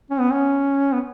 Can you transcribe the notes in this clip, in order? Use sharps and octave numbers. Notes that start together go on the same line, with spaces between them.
C#4
B3
C#4
B3